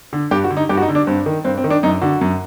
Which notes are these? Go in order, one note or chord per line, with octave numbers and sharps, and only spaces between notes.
D3
G2 G4
F#4
D3
D#4
G2 G4
F#4
D#4
D3
D4
G2 C4
D#3
G2 C4
C4
D#3
D4
F#2 D#4
D3 F#4
F#2